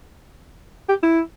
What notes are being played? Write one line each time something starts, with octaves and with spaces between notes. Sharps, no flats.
G4
E4